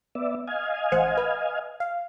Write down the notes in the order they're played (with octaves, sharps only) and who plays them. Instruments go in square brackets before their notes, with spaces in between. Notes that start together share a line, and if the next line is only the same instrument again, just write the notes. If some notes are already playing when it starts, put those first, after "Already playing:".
[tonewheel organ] B3 D5 E5
D#5 F5 G#5
[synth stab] A1 C5 F#5
B4
F5